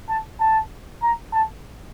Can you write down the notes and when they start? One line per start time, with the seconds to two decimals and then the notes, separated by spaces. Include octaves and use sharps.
0.09 A5
0.40 A5
1.02 A#5
1.33 A5